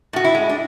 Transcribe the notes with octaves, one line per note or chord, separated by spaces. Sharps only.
A2 F#4
E4
G#3
D4